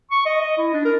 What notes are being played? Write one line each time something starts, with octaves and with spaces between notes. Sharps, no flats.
C#6
D#5
D#5
E4
D4
A#4